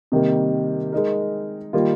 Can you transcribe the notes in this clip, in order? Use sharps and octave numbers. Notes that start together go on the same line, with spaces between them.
C3 D#3 G3 A#3
G#3 D#4 A#4
D#3 G3 A#3 F4